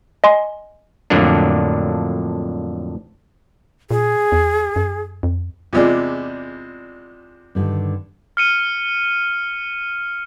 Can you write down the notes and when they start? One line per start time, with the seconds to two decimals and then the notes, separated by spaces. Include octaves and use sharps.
0.24 D#5 G#5 C6
1.10 F2 A2 D3 F#3 A#3 D4
3.91 A#2 G#4
4.32 E2
4.76 F#2
5.23 F2
5.73 E2 C3 G#3 F4 D5
7.55 G2 D3 D#3
8.37 F6 C#7 D#7